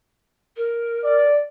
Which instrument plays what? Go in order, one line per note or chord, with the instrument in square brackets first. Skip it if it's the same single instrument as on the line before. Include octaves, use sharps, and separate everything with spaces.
[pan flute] A#4
[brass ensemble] D5